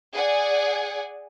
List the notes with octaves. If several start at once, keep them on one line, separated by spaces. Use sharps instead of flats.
G#4 D5 F#5 G#5